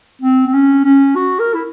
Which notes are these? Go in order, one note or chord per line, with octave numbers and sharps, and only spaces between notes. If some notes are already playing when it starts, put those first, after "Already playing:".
C4
C4
C#4
C#4
F#4
A#4
E4